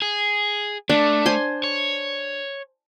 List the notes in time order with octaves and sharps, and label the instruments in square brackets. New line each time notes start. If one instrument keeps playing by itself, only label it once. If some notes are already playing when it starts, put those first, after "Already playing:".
[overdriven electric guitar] G#4
[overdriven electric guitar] A3 [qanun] D4
[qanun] C5 G#5 C6
[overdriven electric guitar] C#5